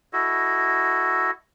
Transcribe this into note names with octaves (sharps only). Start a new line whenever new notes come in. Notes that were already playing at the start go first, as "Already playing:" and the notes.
E4 F#4 A4 D#5